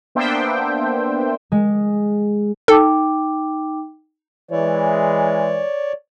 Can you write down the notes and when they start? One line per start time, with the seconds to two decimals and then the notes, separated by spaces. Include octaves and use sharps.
0.15 A#3 B3 D4 C5 E5 G5
1.52 G#3
2.68 D#4 A4 G5 D6
4.51 E3 G#3 C#5 D5